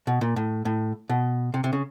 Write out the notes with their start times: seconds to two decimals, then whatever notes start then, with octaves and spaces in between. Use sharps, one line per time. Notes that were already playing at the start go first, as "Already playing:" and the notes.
0.07 B2
0.21 A#2
0.36 A2
0.65 A2
1.09 B2
1.54 C3
1.64 C3
1.73 C#3